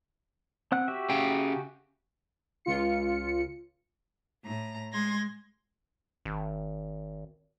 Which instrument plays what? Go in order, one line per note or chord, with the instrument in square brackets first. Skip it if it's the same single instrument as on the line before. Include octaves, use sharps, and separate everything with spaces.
[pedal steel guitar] C4 F#5 F#6
F#4 G4 E5
[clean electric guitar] C#3 G5
[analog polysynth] C#2 F4 C#7
[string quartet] A2 A#5
G#3 C6 G#6 A#6
[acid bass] G#1